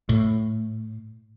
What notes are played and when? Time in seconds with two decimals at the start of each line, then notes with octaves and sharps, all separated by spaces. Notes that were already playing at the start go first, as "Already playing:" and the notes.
0.09 A2